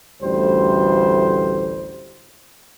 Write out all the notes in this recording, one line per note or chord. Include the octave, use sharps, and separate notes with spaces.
A1 D2 G3 C5